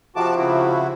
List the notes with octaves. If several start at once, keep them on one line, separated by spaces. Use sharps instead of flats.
C3 F3 F#4 A5 D6
C#3 E4 F#4